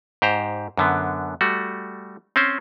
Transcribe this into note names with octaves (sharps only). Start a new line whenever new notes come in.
G#2 G4 C5 A#5
F#2 D3 B3
G3 A3 F#4
C4 C#4 C5